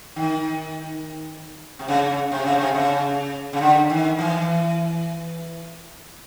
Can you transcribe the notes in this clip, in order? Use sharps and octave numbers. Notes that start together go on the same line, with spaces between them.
D#3
C3
C#3
C3
C#3
C3
C#3
C#3
D3
D#3
E3